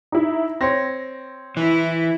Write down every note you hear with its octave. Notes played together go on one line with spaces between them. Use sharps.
D#4 E4
C4 C#5 A#6
E3 E4